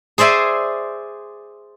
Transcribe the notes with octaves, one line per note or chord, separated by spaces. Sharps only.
G#4 C5 D5 E5 G#5